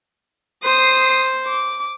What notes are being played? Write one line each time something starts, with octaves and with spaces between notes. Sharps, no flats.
C5 D#6 C7
D6